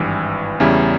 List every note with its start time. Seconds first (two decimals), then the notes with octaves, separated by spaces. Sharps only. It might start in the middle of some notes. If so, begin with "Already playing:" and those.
Already playing: G#1 G2 E3
0.60 E2 C#3 G3 C#4 E4